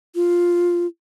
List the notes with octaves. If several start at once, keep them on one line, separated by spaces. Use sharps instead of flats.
F4